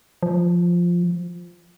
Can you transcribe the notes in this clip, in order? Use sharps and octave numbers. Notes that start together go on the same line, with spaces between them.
F3